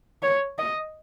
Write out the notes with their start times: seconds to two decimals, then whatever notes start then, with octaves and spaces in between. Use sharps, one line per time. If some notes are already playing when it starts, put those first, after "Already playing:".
0.22 C#5
0.58 D#5